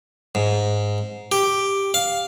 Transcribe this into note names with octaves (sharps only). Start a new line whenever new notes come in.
G#2
G4
F5